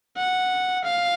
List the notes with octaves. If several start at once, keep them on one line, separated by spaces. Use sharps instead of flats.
F#5
F5